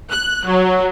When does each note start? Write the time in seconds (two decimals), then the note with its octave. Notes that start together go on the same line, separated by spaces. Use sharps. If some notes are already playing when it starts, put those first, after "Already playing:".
0.11 F#6
0.46 F#3